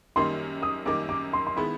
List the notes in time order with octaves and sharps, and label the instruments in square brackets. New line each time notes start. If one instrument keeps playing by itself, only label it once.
[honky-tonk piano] F#2 D#3 G3 A#3 D#4 [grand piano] C6
[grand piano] D#6
[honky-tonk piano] F#2 D#3 G3 A#3 D#4 [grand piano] D6
[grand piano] D6
C6
C6
[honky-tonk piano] D#3 G#3 B3 E4 [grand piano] B5